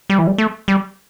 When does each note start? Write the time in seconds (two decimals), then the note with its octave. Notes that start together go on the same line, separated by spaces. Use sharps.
0.10 G3
0.19 E3
0.27 G3
0.38 A3
0.68 G3